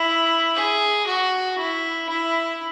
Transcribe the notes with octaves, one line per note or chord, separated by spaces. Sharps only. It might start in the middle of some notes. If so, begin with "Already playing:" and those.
Already playing: E4
G#4
F#4
E4
E4